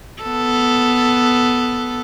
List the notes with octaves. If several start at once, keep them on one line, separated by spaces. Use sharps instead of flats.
B3 A4